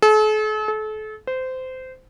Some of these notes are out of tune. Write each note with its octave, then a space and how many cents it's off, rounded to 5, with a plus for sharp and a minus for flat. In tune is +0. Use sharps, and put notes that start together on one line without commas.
A4 -45
A4 -35
C5 -20